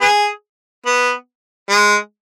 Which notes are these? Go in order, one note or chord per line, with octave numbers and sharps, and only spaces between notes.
B3 G#4
B3
G#3